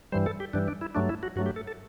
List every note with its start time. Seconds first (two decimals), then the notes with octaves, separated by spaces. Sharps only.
0.12 G2 E3 G3 C5
0.26 A4
0.40 G4
0.53 G2 E3 G3 D4
0.68 D4
0.81 E4
0.95 G2 F#3 A3 D4
1.09 E4
1.23 F#4
1.36 G2 F#3 A3 F#4
1.46 G4
1.56 A4
1.67 A4